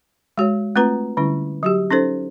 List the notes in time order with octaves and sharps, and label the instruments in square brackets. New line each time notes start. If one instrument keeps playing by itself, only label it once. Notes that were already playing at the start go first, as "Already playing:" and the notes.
[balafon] G#3 F#4 C#5
A3 C4 F4 B4 A#5
D3 G3 C#4 E4
F#3 F#4 G4
C#4 D#4 A4 C5